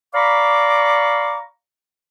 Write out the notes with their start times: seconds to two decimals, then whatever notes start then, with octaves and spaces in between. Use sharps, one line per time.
0.15 D5 F5 A#5 B5 C#6 D6